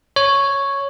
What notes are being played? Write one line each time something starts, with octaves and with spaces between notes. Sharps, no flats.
C#5